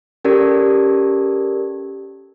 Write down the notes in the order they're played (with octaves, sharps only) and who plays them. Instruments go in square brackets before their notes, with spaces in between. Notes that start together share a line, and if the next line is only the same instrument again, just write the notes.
[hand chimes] C#4 G4 A4 A#4 D5 G#6